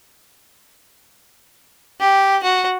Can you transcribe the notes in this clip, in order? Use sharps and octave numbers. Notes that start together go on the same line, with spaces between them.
G4
F#4